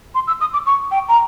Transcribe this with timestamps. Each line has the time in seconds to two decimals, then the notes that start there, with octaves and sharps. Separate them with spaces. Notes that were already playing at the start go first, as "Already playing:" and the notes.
0.15 C6
0.27 E6
0.41 D#6
0.53 D6
0.66 C#6
0.91 G5
1.08 A#5